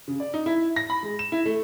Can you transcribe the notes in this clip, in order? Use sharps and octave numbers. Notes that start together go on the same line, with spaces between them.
C#3
D5
D#4
E4
A#6
B5
G#3
E7
E4
A3